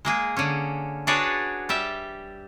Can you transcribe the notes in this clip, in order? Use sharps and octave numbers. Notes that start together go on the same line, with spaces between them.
G#3 A#3 G#4
D3 C#4
D4 F#4 G#4 B4 C#5 D5
G3 G4 E5